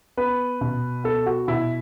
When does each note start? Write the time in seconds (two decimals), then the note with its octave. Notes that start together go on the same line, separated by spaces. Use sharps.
0.17 B3 B4
0.61 B2
1.04 B3 A4
1.26 F#4
1.48 B2 E4